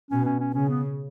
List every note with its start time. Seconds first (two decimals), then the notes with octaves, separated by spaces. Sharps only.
0.10 B2 C#4
0.25 C#4
0.40 C#4
0.54 C#3 C#4
0.69 B3